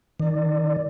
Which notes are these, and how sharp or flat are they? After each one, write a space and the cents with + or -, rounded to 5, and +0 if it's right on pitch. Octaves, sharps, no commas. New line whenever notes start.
D#3 +20 D5 +20